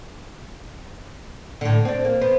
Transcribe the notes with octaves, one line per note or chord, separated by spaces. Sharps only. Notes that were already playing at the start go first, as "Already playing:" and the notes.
A2 D3
C4 D4
A#3
B3 C5